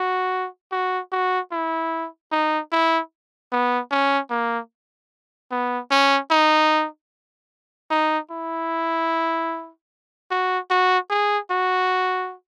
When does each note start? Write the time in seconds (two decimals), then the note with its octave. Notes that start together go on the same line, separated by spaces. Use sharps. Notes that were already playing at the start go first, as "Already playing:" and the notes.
Already playing: F#4
0.72 F#4
1.12 F#4
1.52 E4
2.32 D#4
2.72 E4
3.52 B3
3.91 C#4
4.31 A#3
5.52 B3
5.91 C#4
6.31 D#4
7.91 D#4
8.31 E4
10.31 F#4
10.70 F#4
11.10 G#4
11.51 F#4